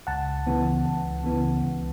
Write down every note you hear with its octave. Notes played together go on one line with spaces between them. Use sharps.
C#2 F#5 A5
C#3 E3 B3
C#2
C#3 E3 B3
C#2